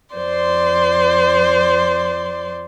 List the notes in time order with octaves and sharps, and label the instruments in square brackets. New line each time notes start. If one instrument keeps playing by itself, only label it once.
[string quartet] F2 C5 D5 C6